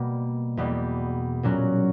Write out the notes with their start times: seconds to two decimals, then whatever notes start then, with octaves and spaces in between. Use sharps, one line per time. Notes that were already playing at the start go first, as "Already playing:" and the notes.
Already playing: B2 G3 A#3
0.57 E2 B2 G3 A#3
1.43 A#2 F#3 C#4 F#4